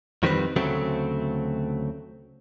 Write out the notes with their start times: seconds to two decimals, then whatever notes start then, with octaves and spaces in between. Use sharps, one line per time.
0.23 F2 D#3 G3 C4 B4
0.56 D2 C#3 F#3 A3 C4